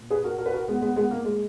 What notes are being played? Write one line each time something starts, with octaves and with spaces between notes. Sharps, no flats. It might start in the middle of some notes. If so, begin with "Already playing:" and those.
Already playing: A#2
G#4 B4
F#4 A#4
F#4 A#4
B4
F#4 A#4
G#3 B3
G#3 B3
G#3 B3
A#3
G#3